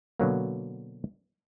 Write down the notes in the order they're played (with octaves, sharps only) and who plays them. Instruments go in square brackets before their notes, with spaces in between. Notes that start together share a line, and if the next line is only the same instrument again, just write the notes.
[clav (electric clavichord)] B2 D3 F#3 A#3